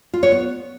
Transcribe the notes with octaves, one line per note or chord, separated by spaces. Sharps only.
F4
C#5
B3